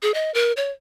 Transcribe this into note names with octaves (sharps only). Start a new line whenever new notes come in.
G#4
D#5
A#4
C#5